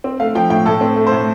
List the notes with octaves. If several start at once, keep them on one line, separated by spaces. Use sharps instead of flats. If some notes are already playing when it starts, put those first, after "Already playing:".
C4
A3 F5
F3 G5
A2 G5
A2 A4
C4
A3
C5
A2